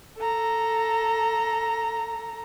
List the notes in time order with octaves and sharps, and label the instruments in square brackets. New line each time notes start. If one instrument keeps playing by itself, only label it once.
[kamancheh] A4 A#5